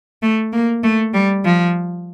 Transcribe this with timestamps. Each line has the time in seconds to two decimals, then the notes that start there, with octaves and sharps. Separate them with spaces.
0.22 A3
0.53 A#3
0.83 A3
1.14 G3
1.44 F3